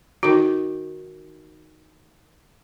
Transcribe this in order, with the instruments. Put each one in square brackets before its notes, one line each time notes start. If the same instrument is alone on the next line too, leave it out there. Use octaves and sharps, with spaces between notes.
[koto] D#3 D#4 [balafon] F#4